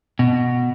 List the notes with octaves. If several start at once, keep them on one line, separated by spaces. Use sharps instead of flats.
B2